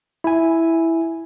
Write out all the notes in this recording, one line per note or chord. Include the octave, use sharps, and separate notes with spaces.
E4 G#5